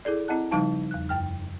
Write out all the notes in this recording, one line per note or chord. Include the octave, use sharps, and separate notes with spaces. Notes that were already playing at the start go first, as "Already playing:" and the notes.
E4 G#4 A4 D5
C4 E4 D#5 F#5 A5 F#6
C#3 F3 G3 D#4 F5 A5
E2 F#6
F#2 G5 F6